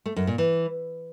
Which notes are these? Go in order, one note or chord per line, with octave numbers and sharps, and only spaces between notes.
A3
F#2
A#2
E3